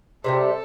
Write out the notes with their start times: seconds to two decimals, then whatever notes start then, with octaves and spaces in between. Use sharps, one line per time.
0.24 C3 E3 G3 A4